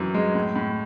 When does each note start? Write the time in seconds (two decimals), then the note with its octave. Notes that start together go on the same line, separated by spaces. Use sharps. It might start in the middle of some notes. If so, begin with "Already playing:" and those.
Already playing: F#2 E3 F#3
0.14 G#3
0.35 A2
0.56 A2